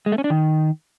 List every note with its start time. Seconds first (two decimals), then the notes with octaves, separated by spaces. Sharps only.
0.06 G#3
0.12 A3
0.18 C#4
0.24 D4
0.30 D#3